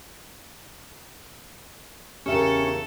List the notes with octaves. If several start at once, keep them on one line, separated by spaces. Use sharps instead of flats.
E2 C#3 C#4 G4 A4 A#4 E5 G5